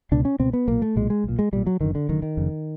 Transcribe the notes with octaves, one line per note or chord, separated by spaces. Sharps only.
C#2 B2 D4
C#4
C#2 B2 C4
B3
B1 A#2 A#3
A3
B1 A#2 G#3
G#3
B1 A#2
G#3
B1 A#2 G3
F#3
F#1 F#2 D3 D#3
D3
F#1 F#2 D3 D#3
D#3
F1 F2 C#3